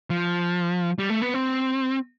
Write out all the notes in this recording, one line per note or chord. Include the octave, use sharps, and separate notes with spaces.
F3
G3
A3
B3
C4